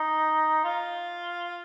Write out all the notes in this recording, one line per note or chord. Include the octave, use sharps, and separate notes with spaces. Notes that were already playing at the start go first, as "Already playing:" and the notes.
Already playing: D#4
F4